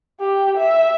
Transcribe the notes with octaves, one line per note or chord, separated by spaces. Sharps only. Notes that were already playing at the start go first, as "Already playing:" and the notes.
G4
E5